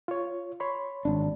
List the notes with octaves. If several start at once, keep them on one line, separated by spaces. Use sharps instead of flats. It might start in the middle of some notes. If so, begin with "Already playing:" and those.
F4 C#5
C#5 B5 C6
G#1 D4